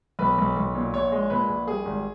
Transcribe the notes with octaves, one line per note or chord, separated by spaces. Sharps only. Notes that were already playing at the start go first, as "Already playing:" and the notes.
B1 B4
B1
B1
A#2
A#1 C#5
G#3
A#2 B4
A#1
G3 G#4
G#1